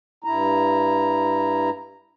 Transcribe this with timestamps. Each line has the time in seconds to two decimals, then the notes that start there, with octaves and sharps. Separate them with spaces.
0.24 G2 E4 A#5